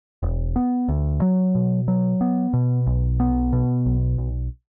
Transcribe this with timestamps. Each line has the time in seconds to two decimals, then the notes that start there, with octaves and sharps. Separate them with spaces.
0.23 E1
0.56 B3
0.89 D2
1.22 F#3
1.55 B2
1.88 F#3
2.21 B3
2.54 B2
2.86 B1
3.20 B3
3.53 B2
3.86 B1
4.18 B1